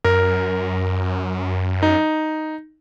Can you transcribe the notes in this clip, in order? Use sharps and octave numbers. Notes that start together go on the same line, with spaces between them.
F#2 A#4
D#4